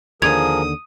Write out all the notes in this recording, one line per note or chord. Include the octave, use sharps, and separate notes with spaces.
D#2 D3 F3 G#4 A#4 D#6 G#6 F7